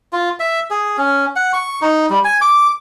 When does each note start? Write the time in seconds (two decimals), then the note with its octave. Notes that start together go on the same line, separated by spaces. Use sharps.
0.13 F4
0.40 E5
0.71 G#4
0.98 C#4
1.36 F#5
1.53 C#6
1.82 D#4
2.10 G3
2.25 G#5
2.41 D6